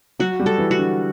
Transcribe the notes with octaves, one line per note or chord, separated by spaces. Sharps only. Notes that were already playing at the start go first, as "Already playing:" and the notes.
F#3 F#4
G3
A4
E3
F#4
D3